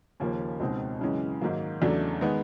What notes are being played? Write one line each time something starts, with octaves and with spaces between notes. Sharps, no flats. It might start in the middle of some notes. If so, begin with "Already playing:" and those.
D#2 C#3 F3 A#3 C#4
C#2 B2 G#3 C4 D#4
F#2 C#3 E3 G#3 C#4
G#2 D#3 F#3 A#3
E2 C#3 F#3 A3 D4
D#3 G#3 B3